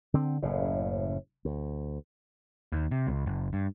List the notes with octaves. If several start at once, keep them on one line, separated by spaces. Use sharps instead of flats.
D3 C4
F#1 A2 C#3
D2
D#2
C3
C#2
F#1
G2